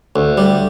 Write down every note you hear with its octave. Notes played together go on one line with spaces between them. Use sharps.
D2
G3